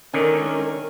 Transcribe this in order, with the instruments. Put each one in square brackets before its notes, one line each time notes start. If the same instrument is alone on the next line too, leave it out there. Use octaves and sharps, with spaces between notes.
[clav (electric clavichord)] D3 D#3 [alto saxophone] C#4 [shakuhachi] A#4